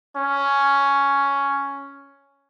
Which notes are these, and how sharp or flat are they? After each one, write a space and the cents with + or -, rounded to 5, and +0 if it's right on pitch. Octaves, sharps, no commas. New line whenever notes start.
C#4 +5